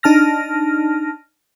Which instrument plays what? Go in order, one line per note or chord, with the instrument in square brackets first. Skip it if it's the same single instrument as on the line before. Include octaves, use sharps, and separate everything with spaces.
[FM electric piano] D4 D#4 A5 F6 A#6